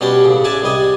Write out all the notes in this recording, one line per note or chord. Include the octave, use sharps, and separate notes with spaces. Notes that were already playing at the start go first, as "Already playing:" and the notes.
B2 G3 C#4 D4 G5
A1 C#3
D4 D5 E5 G#5 A5
C2 G3 D#5 G#5